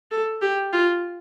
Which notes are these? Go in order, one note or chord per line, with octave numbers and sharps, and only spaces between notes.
A4
G4
F4